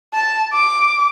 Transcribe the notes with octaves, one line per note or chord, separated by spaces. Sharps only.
A5
D6